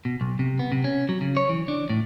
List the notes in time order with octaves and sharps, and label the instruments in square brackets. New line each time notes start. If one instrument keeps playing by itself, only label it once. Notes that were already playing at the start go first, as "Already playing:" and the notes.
[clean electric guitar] B2
B1
C3
B3
C3
C#4
F#3
C#3
C#5
E3
D4
A2